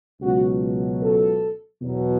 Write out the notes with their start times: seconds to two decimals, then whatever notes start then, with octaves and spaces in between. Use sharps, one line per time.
0.21 C#2 B2 F#3 F#4
1.02 A4
1.82 E2 B2 F#3